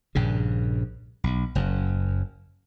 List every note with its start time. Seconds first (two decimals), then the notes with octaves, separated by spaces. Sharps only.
0.15 A#1 G2 C#3
1.24 B1
1.55 F#1 F#2